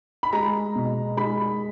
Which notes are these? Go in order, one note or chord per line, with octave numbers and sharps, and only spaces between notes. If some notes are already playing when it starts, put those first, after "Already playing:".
B5
G#3 A#5
B2
G#3 B5